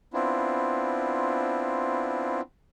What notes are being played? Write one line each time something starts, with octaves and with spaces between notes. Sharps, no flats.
B3 C4 D4 E4 F4